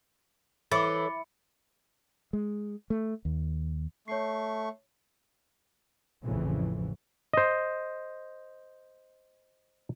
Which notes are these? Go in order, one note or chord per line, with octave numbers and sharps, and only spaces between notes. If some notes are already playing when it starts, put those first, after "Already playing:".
E3 A4 C#5 B5 D6 A6 C#7
G#3
A3
D#2
A3 C#5 C#6 C7
A1 F2 A2 C#3 E3
C5 D#5